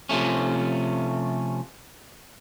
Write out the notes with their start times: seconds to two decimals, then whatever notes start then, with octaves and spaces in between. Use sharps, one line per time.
0.09 C3 F3 A3 C#4